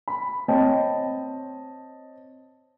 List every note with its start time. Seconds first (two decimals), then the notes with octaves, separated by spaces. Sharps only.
0.08 B5
0.48 C4 C#5 D#5 G5 A5